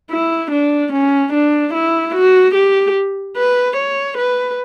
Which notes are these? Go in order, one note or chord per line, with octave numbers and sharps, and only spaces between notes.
E4
D4
C#4
D4
E4
F#4
G4
B4
C#5
B4